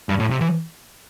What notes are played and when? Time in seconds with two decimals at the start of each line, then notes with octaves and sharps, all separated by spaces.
0.09 G2
0.20 A2
0.30 C3
0.41 E3